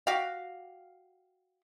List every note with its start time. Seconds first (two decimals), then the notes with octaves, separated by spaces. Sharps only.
0.07 F#4 G4 F5